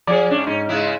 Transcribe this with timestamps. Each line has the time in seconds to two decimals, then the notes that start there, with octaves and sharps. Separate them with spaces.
0.07 F3 G#4 D5
0.31 G#2 C#4 D4
0.47 G#2 C#4
0.69 C#3 G#3 E4